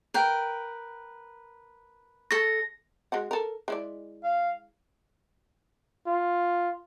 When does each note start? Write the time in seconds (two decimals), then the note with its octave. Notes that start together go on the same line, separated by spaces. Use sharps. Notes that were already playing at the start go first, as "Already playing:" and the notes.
0.14 A#4 B4 G5
2.31 A4 C#6 A#6
3.12 G#3 F#4 F#5
3.31 A4 A#4
3.68 G#3 E4 D5
4.24 F5
6.07 F4